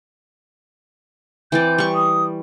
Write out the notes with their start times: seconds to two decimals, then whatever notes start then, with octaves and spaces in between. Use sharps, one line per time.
1.52 E3 C4 D5 G6
1.78 G3 C#6
1.95 D#6